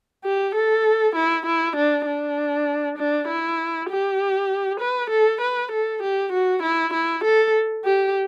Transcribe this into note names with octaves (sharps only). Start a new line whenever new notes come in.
G4
A4
E4
E4
D4
D4
D4
E4
G4
B4
A4
B4
A4
G4
F#4
E4
E4
A4
G4